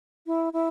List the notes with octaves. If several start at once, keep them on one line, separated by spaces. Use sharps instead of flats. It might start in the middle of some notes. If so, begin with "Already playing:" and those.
E4
E4